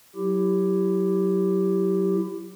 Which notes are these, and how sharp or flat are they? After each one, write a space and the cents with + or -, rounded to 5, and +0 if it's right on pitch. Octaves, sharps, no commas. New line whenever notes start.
F#3 +0 E4 +20 G4 +0